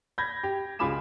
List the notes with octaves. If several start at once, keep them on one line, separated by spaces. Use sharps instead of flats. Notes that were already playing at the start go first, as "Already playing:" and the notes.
B5 G6 G#6 A#6
G4
C#2 F4 G#5 B5 D6 E7